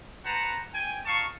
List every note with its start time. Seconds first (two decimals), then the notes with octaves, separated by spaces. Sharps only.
0.25 B4 C5 F#5 A5 A#5
0.73 G5 G#5
1.06 D#4 F5 A5 C#6